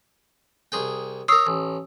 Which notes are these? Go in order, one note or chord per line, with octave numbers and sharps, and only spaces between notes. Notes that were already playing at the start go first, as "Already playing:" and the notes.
C2 G#4 G5
A#4 C#5 D#6 E6 C7
A1